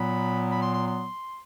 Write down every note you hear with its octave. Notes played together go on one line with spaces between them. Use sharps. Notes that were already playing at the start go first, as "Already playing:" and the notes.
Already playing: A#2 F#3 B3 B5
B5
C6
C6
C6